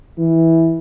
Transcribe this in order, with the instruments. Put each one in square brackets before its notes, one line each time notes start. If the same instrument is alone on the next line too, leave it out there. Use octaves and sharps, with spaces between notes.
[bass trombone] E3